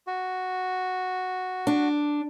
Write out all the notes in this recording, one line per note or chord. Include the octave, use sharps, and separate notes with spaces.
F#4
D4